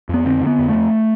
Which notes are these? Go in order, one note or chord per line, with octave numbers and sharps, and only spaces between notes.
F2 B3
D3 C4
D3
B3
F2
F2 A3